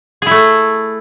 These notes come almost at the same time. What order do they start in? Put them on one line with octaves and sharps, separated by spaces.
G#4 E4 A3